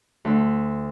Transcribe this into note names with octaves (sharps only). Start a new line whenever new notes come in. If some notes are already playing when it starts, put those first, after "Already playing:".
D2 C6 E6